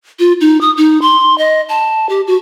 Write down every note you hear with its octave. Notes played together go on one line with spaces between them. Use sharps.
F4
D#4
D#6
D#4
C6
D#5
A5
G4
F#4